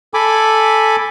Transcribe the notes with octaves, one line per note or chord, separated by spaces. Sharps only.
A4 G#5 B5 D6